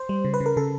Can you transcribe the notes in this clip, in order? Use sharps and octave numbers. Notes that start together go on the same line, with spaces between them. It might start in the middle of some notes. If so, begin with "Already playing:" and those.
Already playing: C5
G3
C#3
B4
C#3
A#4
C#3 A4